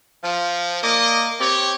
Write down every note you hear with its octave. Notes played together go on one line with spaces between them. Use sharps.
F3
A#3 D5 D#5
C4 G4 C#5